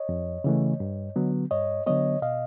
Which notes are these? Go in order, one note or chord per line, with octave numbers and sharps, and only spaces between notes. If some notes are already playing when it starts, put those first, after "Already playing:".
Already playing: C#5 D#5
F2
C#3 E3 A3
G2
D3 F#3 B3
G2 C#5 D#5
D3 F#3 B3 C#5 D#5
B2 D#5 F5